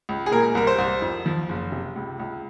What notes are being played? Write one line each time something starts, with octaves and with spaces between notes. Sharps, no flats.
C#2
G#4
A#2 A#4
C2 A#4
C5
C2
F2
F3
F#1
C3
C#2
C#2